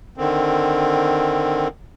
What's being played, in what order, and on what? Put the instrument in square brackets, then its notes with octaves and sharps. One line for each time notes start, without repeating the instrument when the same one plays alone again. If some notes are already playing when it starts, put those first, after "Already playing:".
[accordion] D3 D#3 C4